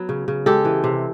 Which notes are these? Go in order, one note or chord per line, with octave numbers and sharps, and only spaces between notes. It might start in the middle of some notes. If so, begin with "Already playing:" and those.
Already playing: F#3 B3
C#3
C#3
G#3 G4 A4
E3
C3